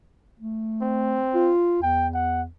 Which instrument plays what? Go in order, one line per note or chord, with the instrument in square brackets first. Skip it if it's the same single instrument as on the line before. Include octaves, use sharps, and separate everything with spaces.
[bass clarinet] A3
[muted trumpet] C4
[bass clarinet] F4
[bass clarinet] E2 [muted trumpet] G5
[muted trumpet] F#5